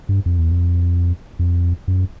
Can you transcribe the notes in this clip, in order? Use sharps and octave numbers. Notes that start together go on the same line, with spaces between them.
G2
F2
E2
F2
F2
F#2